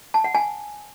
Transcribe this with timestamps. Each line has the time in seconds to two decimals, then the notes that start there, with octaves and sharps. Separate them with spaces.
0.14 A5
0.24 F#5
0.35 G#5